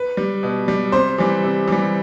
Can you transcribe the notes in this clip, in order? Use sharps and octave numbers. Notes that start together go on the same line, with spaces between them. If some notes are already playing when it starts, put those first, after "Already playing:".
Already playing: B4
G3
B2
G3
C3 C5
E3 G3
C3
E3 G3